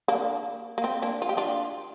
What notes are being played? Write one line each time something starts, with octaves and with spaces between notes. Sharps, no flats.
A#3 D4
A#3
C4
A#3 D4
F4
G4
D4 F4